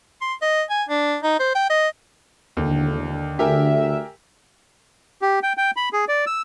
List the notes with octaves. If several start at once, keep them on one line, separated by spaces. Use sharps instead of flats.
C6
D#5
G#5
D4
D#4
C5
G5
D#5
E1 D#2 D3
D2 G4 A#4 E5 G#5
G4
G5
G5
B5
G#4
D5
E6